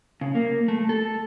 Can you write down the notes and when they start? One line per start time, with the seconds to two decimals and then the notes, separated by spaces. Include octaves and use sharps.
0.21 C#3
0.35 A#3
0.68 A3
0.89 A4